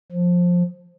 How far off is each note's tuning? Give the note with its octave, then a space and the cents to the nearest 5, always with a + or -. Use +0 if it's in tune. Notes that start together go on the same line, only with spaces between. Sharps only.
F3 +15